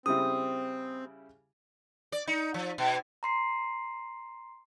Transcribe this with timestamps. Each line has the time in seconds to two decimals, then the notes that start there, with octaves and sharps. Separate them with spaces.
0.06 C#3 G3 C4 E4 D#6
2.12 D5
2.27 D#4
2.54 F3
2.78 B2
3.23 A#5 C6 C7